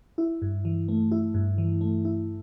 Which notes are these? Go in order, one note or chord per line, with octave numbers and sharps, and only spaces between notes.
E4
G2
E3
A3
E4
G2
E3
A3
E4